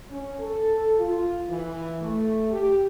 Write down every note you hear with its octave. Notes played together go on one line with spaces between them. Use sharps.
C#4
A4
F4
E3
A3
G4